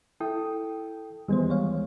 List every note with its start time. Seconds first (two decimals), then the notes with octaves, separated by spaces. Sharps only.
0.20 E4 A4 G5 D#6
1.28 D#2 E3 G3 G#3 B3 C5
1.50 C#5 F5